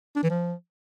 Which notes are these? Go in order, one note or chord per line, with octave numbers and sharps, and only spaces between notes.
D4
E3
F3